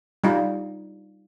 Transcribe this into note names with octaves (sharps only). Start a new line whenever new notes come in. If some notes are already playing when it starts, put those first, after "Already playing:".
G3 D#4 F4